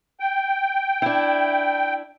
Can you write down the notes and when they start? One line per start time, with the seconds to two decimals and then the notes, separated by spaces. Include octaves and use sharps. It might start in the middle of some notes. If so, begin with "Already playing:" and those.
0.20 G5
1.02 D4 E4